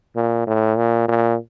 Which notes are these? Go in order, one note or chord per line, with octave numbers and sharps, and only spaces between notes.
A#2
A2
A#2
A#2